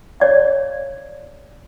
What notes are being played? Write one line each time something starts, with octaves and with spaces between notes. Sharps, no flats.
C#5 D5 F5